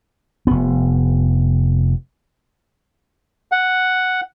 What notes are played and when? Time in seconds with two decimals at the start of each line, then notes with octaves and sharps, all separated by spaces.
0.47 F1 B3
3.52 F#5